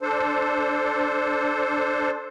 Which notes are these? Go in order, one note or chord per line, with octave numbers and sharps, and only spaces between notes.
D4 A4 C5